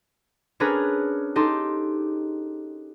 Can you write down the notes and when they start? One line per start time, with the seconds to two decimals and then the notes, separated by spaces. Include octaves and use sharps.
0.60 C#4 D4 G#4 A#4 B4 A#5
1.36 D#4 G4 A4 A5 C6